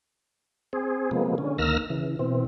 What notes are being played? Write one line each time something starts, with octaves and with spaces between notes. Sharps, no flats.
C4 G#4
C3 F3 G#3 A#3 B3
D3 C#4
D2 D#3 A#3 E6 F6 A#6
C#3 E3
B2 E3 C4